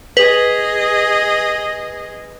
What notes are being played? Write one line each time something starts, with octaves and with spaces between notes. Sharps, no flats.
G#4 B4 D#5